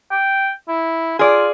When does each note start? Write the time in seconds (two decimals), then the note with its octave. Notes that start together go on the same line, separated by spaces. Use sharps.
0.11 G5
0.69 E4
1.19 F4 G#4 D5